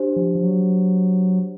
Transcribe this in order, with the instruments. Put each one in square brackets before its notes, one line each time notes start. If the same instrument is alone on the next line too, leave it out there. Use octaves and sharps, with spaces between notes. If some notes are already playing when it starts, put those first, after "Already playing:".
Already playing: [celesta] D4 G4 C5
[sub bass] F3
F3
F#3